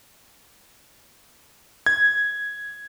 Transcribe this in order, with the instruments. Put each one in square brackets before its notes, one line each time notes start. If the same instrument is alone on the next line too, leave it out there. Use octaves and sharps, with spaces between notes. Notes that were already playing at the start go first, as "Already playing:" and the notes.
[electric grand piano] G#6